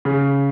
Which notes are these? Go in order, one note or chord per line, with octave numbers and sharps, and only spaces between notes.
C#3